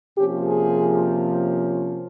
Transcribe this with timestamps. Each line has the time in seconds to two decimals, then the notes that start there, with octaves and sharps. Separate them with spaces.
0.17 C3 F3 A#3 C#4 G4
0.46 G#4